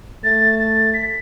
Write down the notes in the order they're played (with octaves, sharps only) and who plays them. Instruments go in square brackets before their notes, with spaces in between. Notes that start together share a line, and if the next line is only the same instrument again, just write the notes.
[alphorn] A3 [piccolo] A6
[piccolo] A6
B6